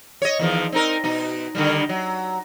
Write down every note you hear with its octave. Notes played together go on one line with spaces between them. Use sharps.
C#5 D#5
E2 D#3 F3
C4 D#4 A#4
B2 D#4
D3 D#3 G3
F#3